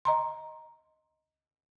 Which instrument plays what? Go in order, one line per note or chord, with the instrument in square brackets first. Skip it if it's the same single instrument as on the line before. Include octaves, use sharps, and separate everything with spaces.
[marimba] D#5 A#5 C6